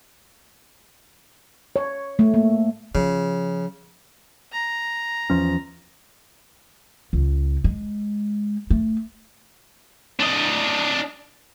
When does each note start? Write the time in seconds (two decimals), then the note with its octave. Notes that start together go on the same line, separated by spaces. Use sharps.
1.76 C#5
2.19 A3
2.34 A#3
2.95 C#3 F3
4.52 A#5
5.30 E2 F3 C#4
7.13 C#2
7.64 G#3
8.70 A3
10.20 D4 D#5